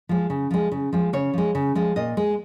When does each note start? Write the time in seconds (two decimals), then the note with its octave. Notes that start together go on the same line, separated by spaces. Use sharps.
0.09 F3 G#3
0.30 C#3
0.51 F3 G#3
0.72 C#3
0.93 F3 G#3
1.13 C#3 C#5
1.33 F3 G#3
1.55 C#3
1.75 F3 G#3
1.96 A#2 D#5
2.17 G#3